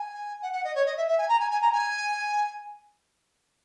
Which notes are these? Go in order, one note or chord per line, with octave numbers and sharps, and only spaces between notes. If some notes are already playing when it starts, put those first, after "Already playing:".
Already playing: G#5
F#5
F#5
D#5
C#5
D#5
E5
E5
G#5
A#5
G#5
G#5
A#5
G#5